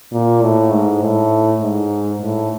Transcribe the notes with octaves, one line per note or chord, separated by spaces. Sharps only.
A#2
A2
G#2
A2
G#2
A2